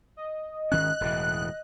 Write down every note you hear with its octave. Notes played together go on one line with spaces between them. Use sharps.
D#5
G#1 D#3 C#4 F#6
E1 A2 E3